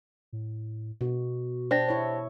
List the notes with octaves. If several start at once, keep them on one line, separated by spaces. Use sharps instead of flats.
A2
B2 F#4
D4 G4 C5 A5 A#6
E4 C#5